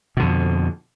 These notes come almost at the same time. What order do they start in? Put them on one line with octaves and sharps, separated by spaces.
B2 D3 F2